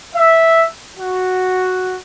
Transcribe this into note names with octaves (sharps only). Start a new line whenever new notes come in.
E5
F#4